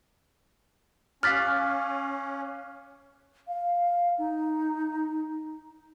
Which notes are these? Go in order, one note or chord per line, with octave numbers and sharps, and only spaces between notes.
C#4 F5 D6 F6 F#6 A6 B6
F5
D#4